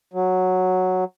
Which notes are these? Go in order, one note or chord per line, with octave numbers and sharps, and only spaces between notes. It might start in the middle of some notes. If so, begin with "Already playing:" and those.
F#3